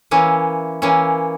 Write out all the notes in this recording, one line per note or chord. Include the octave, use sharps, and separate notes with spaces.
E3 A#3 C#4
E3 A#3 C#4